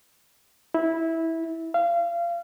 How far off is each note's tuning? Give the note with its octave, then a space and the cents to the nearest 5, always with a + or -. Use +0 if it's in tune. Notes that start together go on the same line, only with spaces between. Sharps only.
E4 -15
F5 -30